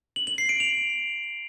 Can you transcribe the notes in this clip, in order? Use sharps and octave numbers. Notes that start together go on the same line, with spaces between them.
F#7
F#7
C7
D7
F7